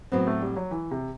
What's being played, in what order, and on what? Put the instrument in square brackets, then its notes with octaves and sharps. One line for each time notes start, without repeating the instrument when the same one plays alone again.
[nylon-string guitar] A2 F#3 C4 [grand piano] B3
[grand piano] A3
G3
F#3
E3
C3